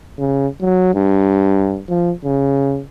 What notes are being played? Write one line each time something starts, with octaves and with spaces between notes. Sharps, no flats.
C#3
F#3
G2
F3
C#3